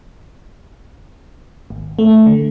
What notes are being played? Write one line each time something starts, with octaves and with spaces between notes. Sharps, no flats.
G#1
A3
D3